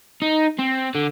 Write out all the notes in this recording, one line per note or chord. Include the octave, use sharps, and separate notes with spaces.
D#4
C4
D3